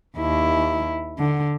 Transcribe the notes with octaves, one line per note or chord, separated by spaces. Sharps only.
D#2 E4
D3